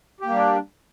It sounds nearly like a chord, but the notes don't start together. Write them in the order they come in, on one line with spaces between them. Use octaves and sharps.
G4 A#3 G3 D4